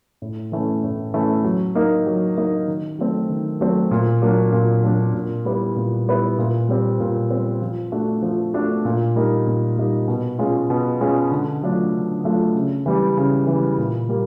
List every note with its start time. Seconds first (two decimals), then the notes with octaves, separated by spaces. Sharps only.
0.22 A2
0.52 E3 A3 C#4 E4
0.83 A2
1.14 E3 A3 C#4 E4
1.44 F#3
1.75 A#3 D#4
2.07 F#3
2.37 A#3 D#4
2.68 D#3
2.99 F#3 A3 C4
3.30 D#3
3.61 F#3 A3 C4
3.91 A#2
4.22 F#3 A#3 D4 F#4
4.52 A#2
4.84 F#3 A#3 D4 F#4
5.14 A#2
5.45 G3 B3 E4
5.76 A#2
6.07 G3 B3 E4
6.38 A#2
6.69 G3 C4
7.00 A#2
7.31 G3 C4
7.62 F3
7.92 A3 D4 F#4
8.22 F3
8.54 A3 D4 F#4
8.85 A#2
9.15 G3 A#3 D#4
9.47 A#2
9.77 G3 A#3 D#4
10.08 B2
10.39 G#3 C#4 F4
10.70 B2
11.01 G#3 C#4 F4
11.31 D3
11.63 F#3 A3 D4 F4
11.93 D3
12.24 F#3 A3 D4 F4
12.54 C#3
12.86 E3 G3
13.17 C#3
13.47 E3 G3
13.78 A#2
14.09 G3 A#3